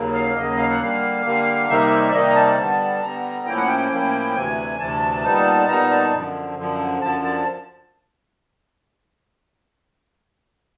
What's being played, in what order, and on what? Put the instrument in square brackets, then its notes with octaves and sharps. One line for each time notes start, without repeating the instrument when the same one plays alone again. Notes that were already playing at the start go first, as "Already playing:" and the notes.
Already playing: [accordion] D#2 C#3 F#3 A#3
F5
D#2 C#3 F#3 A#3 D#5
F5
F#5
D3 G3 A#3 F5
D3 G3 A#3
C3 D#3 G3 A#3 D#4 E5
D5
C3 D#3 G3 A#3 D#4 D#5
A#5
A5
D3 G3 B3
D3 G3 B3 A#5
A2 F3 A#3 C#4 E4 G5
F#5
G5
A2 F3 A#3 C#4 E4
D2 C3 E3 G#5
D2 C3 E3 A5
A#2 G3 B3 D#4
A#2 G3 B3 D#4 A#5
A5
F#2 D3 F3
F#2 D3 F3
F#2 D3 F3 A5
A5